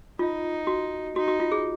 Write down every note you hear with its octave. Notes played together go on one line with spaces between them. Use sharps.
D#4 F4
F#4
D#4 F#4
F#4
F4
G#4